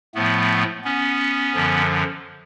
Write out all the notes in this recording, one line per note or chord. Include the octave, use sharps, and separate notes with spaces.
A2 F3 A3 B3
B3 C#4
F#2 D3 F3